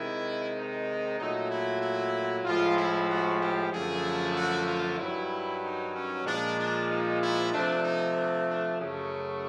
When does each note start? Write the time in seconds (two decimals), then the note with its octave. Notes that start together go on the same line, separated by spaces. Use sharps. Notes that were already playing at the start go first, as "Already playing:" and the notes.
Already playing: C3 D#3 G#3 E4
0.55 D#4
1.18 A#2 F#3 A3 D#4
1.50 E4
1.81 E4
2.44 A2 F3 G#3 F4
2.76 E4
3.09 F#4
3.40 G4
3.71 F#2 D3 F3 A3 G#4
4.35 F#4
4.66 F4
4.98 G2 D#3 F#3 E4
5.61 D#4
5.93 C#4
6.25 A#2 F3 G#3 D4
6.57 D4
6.89 D#4
7.20 E4
7.52 C3 F3 A3 D4
7.83 D#4
8.15 D4
8.47 D4
8.78 F#2 C#3 F#3 A3 C#4